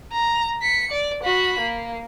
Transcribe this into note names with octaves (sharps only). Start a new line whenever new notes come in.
A#5
B6 C#7
D5
F#4 B5
A#3